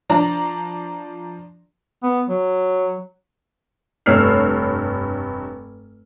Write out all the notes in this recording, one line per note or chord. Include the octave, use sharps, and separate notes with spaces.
F3 D4 D5 A#5
B3
F#3
F1 G2 C#5 E6 F6 C7